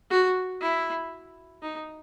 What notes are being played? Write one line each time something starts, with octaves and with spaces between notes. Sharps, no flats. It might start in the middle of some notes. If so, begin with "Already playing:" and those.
F#4
E4
D#4